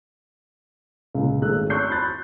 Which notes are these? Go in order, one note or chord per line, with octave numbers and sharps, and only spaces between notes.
C#2 A#2
G#1 G#3 A3 E6 F#6
C6 C#6 E6 F#6 G6 C7
B5 C6 F#6 A6